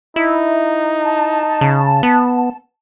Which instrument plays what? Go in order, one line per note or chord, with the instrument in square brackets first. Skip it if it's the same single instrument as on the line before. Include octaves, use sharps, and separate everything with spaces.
[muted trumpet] D#4 [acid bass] E4
[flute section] A5
[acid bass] C#3
B3